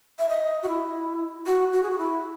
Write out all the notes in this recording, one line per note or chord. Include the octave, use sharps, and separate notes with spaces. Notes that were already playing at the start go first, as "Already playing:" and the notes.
E5
D#5
F#4
E4
F#4
F#4
G#4
F#4
E4